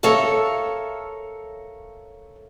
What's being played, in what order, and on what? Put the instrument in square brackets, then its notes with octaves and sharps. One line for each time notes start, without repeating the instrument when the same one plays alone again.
[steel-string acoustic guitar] A4 A#4 C#5 E5 F5 A5